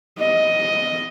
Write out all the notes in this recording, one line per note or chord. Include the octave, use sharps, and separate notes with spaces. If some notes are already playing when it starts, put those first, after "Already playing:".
D#5